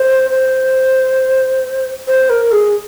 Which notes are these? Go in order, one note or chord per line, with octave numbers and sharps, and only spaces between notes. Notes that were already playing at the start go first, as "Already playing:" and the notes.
Already playing: C5
C5
C5
A#4
G#4